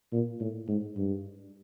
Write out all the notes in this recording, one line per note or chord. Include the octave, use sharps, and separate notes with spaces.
A#2
A2
G#2
G2